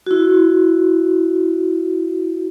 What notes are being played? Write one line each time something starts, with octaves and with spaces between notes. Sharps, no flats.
E4 F#4